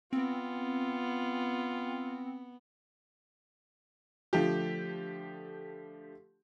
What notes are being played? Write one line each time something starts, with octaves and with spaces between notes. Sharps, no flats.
B3 C4 F4
D3 F3 A3 G4